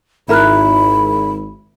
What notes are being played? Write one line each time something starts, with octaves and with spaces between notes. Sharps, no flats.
G#1 E4 A#4 E5 B5 F6 F#6